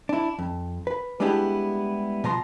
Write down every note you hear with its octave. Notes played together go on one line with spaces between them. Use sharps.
D4 E4
F2
B4
G3 G#3 B3 D4 E4 G4
B2 F3 A#5 C6